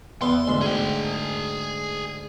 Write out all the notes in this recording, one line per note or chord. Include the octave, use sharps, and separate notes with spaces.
E2 B3 C6
D2 G#2
G#4 G5